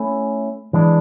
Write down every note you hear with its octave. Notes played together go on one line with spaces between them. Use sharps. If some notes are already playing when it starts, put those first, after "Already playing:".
Already playing: A3 C#4 E4
E3 G#3 D4